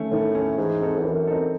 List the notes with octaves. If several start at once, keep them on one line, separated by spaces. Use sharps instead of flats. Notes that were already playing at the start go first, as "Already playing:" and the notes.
Already playing: D#3 A3 C#4
A2 D#3
A3 C#4
G#2 E3
C4 D#4 A4
E2
F#2 E3
C4 D#4 A4